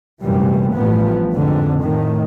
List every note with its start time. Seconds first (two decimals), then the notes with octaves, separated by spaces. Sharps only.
0.22 F1 F#2 A#2 E3 G3
0.73 A1 G2 F3 B3
1.34 F2 G#2 D3
1.81 A2 D#3